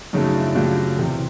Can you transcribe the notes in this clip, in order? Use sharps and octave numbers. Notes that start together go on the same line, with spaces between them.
F#2 C#3 F#3 A3 C#4 D#4
D4 E4
F#2 C#3 F#3 A3 F4 G4
E2 C3 E3